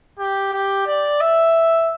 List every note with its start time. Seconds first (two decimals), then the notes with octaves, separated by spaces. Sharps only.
0.19 G4
0.53 G4
0.87 D5
1.21 E5